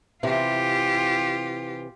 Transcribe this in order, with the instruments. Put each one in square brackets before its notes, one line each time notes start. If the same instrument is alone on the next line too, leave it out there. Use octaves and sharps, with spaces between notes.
[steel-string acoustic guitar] C3 E3 [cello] F4 G4